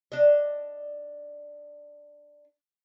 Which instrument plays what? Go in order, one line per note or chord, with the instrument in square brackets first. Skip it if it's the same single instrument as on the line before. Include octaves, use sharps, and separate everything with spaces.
[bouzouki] D4 D#5